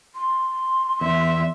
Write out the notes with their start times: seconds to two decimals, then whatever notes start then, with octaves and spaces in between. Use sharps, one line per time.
0.15 C6
1.01 E2 E5